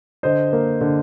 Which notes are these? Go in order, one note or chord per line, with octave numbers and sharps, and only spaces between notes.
D3 C5 D#5
A#3
D3